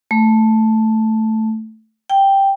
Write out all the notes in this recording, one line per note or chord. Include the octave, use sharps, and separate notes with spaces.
A3
G5